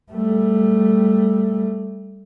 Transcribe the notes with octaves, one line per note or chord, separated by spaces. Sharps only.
G3 A3